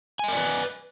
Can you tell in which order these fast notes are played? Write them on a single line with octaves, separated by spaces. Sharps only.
G#5 D#5 A#4 D5 B4